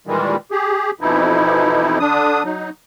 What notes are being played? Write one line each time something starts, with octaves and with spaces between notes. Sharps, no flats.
A#2 D#3 E3 G3 G#3
G4 G#4
F2 B2 E3 F3 D#4 E4
D3 D4 D#6
F#3 D#4